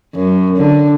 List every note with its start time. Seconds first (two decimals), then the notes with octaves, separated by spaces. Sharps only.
0.15 F#2
0.57 D3